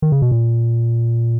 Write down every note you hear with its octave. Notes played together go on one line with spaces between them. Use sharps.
D#3
C#3
B2
A#2